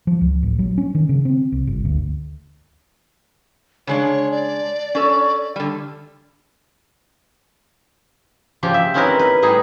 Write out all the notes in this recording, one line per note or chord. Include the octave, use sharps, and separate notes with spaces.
F3
C#2
A1
F#3
C#4
D#3
C#3
C4
C2
G1
D2
C#3 G#3 D4 C#5
D5
C#4 A4
D3 G3
C#3 F3 G4
E5
C4 C#4 D#4 E4 A#4 B4
B4
A2 G3 D#4 G#4